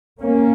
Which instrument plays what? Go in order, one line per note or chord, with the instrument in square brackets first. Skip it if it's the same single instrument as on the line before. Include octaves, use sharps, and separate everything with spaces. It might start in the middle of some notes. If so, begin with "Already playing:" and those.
[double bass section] A#3 C#4